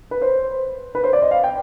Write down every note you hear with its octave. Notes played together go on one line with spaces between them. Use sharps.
B4
C5
B4
C5
D5
D#5
F5
G5